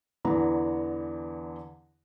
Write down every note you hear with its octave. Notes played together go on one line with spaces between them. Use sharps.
E2 D3 E3 B3 A#5